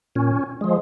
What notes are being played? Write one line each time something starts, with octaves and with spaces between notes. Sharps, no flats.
A#2 C#4
F3 G#3